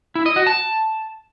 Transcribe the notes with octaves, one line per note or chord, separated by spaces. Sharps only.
E4
D#5
F#4
A5